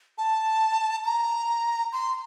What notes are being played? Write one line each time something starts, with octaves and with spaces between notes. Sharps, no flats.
A5
A#5
C6